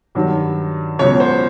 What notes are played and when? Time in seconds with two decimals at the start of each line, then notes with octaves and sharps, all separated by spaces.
0.15 G2 D#3 F#3
0.99 C#2 B2 F#3 C#5
1.20 C5